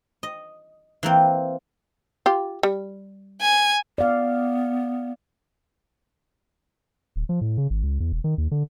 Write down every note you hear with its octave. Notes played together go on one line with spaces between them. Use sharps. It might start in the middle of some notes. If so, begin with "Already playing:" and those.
D#5
E3 A#3 C4
F4 G4
G3
G#5
B3 D5 F5
D1
F3
A2
C#3
G#1
C#2
E2
E1
D#3
D#2
D3